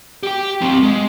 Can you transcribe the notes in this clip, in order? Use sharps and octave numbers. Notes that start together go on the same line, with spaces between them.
G4 G5
F#3 C4
G#3